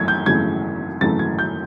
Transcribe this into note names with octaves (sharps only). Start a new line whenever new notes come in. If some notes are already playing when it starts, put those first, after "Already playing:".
Already playing: G#1 F#2 E3 A3 G#6
G6
G#1 F#2 C#3 E3 A3 G#6
G#1 F#2 C#3 E3 A3 A6
G#6
G6